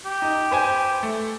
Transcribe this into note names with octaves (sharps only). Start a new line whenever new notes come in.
G4
D#4
B4 C5 G#5
A3